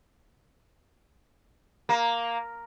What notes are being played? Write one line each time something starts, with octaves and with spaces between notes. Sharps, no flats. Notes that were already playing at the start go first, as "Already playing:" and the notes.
A#3